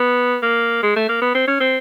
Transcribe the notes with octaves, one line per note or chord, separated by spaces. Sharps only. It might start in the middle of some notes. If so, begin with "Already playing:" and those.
Already playing: B3
A#3
G#3
A3
A#3
B3
C4
C#4
C4